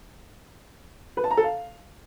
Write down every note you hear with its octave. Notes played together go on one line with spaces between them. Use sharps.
B4
A5
A#5
A4
F5